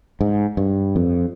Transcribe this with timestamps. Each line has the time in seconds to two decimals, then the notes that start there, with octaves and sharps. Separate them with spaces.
0.21 G#2
0.57 G2
0.96 F2